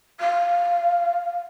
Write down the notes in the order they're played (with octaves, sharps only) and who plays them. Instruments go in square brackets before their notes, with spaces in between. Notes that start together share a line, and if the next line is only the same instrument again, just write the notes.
[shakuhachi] F5